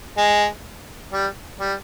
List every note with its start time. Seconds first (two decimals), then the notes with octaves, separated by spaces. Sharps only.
0.17 G#3
1.12 G3
1.59 G3